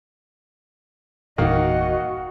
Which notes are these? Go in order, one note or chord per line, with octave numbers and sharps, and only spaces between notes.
G1 E2 A#2 D#3 A#3 F#4 D#5